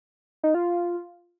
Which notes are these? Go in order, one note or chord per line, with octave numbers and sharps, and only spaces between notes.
D#4
F4